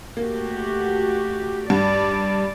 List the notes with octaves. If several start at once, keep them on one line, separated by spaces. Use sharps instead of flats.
A3 A#3 F#4 G4
G2 D5